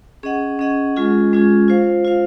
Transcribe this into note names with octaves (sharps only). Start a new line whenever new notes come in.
C#4 G#4 D#5 F#5
C#4 G#4 D#5 F#5
G#3 C#4 F4 G#4
G#3 C#4 F4 G#4
F4 C5 F5
F4 C5 F5